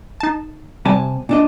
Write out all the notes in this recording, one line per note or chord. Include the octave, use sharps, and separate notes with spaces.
D#4 A5
C3 G3 G#5 A5
A#2 D4 D#5